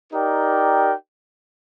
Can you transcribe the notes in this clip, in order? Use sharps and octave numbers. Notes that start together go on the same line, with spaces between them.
D#4 G4 A#4 D5 G5